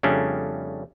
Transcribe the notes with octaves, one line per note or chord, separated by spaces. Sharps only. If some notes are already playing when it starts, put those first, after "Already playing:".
F2 C#3 G3 A3 C#4 D4